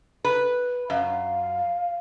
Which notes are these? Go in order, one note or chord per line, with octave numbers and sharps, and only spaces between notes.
B4
F#2 F5